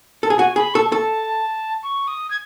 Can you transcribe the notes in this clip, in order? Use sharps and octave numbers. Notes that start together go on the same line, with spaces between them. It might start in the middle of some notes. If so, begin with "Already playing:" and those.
A4
G#4
F#4 G#5
G#4 B5
A4 C#6
A4 A5
C#6
D#6
G#6